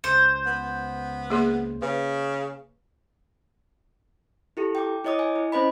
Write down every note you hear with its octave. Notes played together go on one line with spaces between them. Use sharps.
C#2 C5
B3
A#3 G#4 C6
C#3 B4
E4 G4 A4
G5 D6
E4 C#5 D#5 D6 D#6
G#5
E4
C#4 C5 D#5 B5